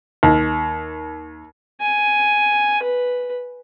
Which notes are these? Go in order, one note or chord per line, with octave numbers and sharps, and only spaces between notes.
D#2
G#5
B4